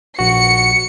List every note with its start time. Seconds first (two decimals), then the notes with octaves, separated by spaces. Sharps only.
0.19 A#1 F#4 C#7